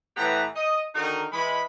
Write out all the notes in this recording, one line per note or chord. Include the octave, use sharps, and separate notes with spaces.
A2 E3 B3 G4 B4 A#5
D#5
D3 D#3 D#4 F#4 A#4
E3 G#3 B5